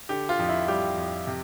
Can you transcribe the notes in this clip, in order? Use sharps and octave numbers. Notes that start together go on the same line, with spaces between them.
D3 G4
F4
F2
E4
G3 G4
F2
C3